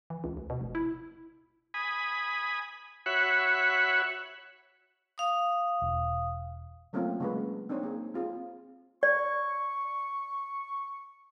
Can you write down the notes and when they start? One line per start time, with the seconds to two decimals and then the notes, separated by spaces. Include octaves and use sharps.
0.10 E3
0.24 C#2
0.37 D2
0.50 B2
0.61 F1
0.75 E4
1.74 G#5 B5 D#6
3.06 F#4 C#5 E5 F#5 B5
5.18 F5 D#6
5.82 E1
6.93 F#3 A3 A#3 C4 C#4 F4
7.20 C#3 F#3 G#3 A#3 B4
7.69 C4 D4 D#4 C5 C#5
7.83 A#3 G#4
8.14 C4 F4 G#4
9.03 D5 C#6